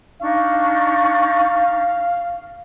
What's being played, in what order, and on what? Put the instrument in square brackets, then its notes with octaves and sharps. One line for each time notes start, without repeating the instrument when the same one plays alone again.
[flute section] D4 D#4 C#6 [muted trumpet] F5